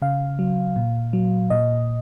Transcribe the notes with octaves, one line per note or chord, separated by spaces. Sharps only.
C#3 F5
F#3
A#2
F#3
A#2 D#5